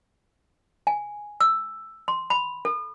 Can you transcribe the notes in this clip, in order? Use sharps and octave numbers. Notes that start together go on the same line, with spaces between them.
G#5
E6
C6
B5
A4